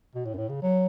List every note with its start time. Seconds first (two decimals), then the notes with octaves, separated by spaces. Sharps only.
0.15 B2
0.25 A2
0.34 F#2
0.38 A2
0.49 C#3
0.62 F#3